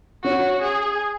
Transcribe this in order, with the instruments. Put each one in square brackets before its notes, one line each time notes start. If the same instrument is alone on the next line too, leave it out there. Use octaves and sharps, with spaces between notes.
[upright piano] C#4 [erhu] F#4
[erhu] G#4